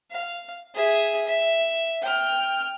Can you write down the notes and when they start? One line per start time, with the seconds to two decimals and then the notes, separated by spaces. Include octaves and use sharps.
0.11 F5
0.75 G#4 E5
1.27 E5
2.02 G5 F6